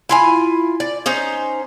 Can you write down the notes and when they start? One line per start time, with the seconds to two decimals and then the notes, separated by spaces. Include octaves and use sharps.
0.09 E4 F4 G#5
0.80 D5
1.06 C#4 D#4 C5